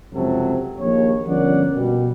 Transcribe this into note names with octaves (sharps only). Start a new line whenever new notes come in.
C#2 F#2 C3 F3 F#3 A4
A#1 D#2 C#5
G1 F3 C#4 A#4 D5 F#5
B2 G3